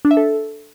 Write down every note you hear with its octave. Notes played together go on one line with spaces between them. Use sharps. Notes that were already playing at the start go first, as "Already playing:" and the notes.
D4
E5
A4